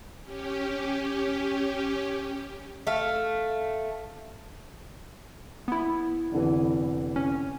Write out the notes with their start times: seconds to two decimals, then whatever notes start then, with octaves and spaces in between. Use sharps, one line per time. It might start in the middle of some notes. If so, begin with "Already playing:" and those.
0.22 C#4 G4
2.87 A3 F5
5.68 B3 E4
6.32 F1 D3 E3
7.16 C#4